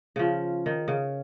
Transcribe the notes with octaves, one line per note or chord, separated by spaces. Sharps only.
C#3 F3
D#3
C#3